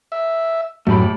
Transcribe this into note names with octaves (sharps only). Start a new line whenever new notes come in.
E5
F#2 A2 F#3 A3 G4 B5